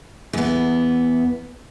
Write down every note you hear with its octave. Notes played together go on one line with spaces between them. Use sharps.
E2 B3